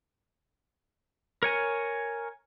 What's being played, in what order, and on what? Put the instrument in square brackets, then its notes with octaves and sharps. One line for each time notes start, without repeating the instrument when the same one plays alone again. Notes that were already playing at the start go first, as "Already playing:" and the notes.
[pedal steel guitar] A#4 C#5 G#5